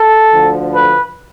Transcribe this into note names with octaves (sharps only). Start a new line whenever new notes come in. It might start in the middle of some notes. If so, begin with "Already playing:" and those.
Already playing: A4
D2 D3 F3
B4